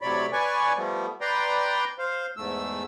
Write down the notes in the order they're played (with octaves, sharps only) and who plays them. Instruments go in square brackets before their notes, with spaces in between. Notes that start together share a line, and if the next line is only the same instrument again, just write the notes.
[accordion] A2 C3 F#3 C#5 D5 B5
B4 C#5 D5 G#5 C#6
F3 G3 A3 B3
B4 D5 G5 A#5 C6
C5 F5
E2 G#2 A3 E6